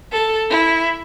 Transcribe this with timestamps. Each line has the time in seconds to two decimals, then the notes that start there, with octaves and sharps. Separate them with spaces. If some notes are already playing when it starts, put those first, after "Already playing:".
0.12 A4
0.52 E4